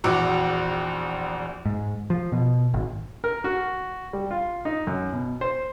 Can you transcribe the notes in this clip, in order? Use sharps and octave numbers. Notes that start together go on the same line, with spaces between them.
A#1 E2 F#4 D6 E6
G#2
F3
B2
G#1
A#4
F#4
G3
F4
D#4
F#2
B2
C5